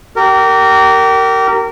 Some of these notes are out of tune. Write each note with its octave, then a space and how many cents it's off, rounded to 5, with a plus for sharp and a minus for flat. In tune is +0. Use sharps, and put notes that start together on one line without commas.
G4 -30 A#4 -20